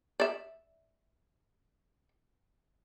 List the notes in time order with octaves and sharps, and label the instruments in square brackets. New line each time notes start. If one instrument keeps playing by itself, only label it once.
[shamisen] D5 E5